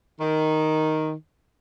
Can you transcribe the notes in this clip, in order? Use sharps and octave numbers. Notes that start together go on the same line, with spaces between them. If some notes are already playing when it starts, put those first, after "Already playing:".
D#3